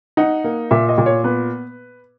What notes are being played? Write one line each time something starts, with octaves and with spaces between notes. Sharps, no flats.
D#4 F#5
A#3
A#2 E5
D#5
A#2
C#5
B3 B4